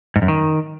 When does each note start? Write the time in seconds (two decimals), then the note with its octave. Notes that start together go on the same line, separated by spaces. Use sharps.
0.16 G#2
0.22 F#2
0.28 D#3